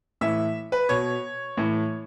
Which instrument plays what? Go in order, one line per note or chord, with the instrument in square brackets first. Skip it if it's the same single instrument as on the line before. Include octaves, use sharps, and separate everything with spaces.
[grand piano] A2 E3 E5
B4
B2 C#5
A2 E3